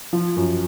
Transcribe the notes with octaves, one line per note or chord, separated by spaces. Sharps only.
F3
F#2